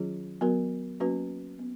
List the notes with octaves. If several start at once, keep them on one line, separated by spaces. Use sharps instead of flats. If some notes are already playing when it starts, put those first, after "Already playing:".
Already playing: D#3 F#3 C#4 F4 G#4
F#3 B3 F#4 A#4
F#3 A#3 C#4 F#4 B4
B3